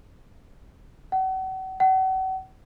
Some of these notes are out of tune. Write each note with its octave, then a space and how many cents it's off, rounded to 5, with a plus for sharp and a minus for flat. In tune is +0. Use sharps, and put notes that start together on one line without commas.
F#5 +40
F#5 +40